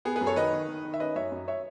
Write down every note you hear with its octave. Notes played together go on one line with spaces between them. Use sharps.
B3 G#4
G#4 B4
F#2
A4 C#5
D#3 B4 D#5
D#3
D#3
D#3
E5
C#4 B4 D#5
F#2 C#5 E5
F#2
C#5 E5